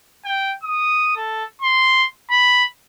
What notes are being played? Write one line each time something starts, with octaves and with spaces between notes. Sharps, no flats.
G5
D#6
A4
C6
B5